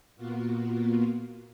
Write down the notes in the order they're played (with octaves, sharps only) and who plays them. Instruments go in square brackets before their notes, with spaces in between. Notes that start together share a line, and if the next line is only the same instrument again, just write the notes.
[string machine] A#2 A#3 B3 F4 F#4